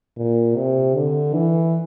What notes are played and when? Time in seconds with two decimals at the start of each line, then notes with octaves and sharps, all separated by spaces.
0.17 A#2
0.56 C3
0.95 D3
1.34 E3